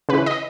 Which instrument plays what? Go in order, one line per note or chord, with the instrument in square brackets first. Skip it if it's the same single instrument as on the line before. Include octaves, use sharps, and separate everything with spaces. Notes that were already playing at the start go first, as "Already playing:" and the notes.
[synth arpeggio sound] C#3 E3 B4
D#5